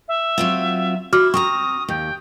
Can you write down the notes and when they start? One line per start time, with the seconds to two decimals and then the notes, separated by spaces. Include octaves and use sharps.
0.08 E5
0.38 F#3 C4 F4
1.13 E4 F#4 D6 F6
1.34 C4 G5 A#5 C#6 D#6
1.89 D#2 G5